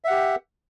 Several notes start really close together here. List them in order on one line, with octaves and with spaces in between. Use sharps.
E5 F#5 G4